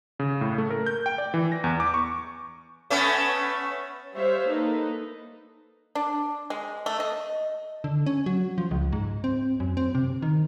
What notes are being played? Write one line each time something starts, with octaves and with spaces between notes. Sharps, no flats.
C#3
A2
A3
A#4
G6
G5
D5
E3
A#6
E2
D6
C#6
A3 B3 C#4
G3 C5 C#5 E5 F5
A#3 D#4 A4 B4
D4
G#3
A3
D#5
D3
C#4
F#3
F3
C#2
G#2
C4
F#2
C4
C3
D#3